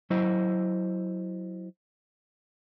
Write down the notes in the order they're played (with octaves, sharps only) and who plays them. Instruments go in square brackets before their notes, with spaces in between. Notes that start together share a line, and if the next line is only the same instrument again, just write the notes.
[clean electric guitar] F#3 E4 C5 D#5